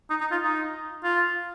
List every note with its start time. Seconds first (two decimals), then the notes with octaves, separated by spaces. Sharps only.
0.10 D#4
0.20 D#4
0.32 F4
0.42 D#4
1.04 F4